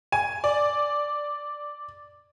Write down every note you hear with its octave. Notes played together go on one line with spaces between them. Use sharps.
G#5
D5